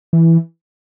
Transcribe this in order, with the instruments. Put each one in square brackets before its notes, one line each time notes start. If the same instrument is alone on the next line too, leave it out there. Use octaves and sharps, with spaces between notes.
[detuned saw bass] E3